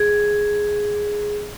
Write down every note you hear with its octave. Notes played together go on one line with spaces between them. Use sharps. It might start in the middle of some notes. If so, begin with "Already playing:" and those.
Already playing: G#4